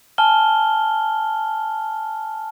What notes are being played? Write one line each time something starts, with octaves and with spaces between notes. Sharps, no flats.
G#5 A5 F6 G7